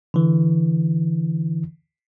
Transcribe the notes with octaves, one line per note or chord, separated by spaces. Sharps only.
D3 E3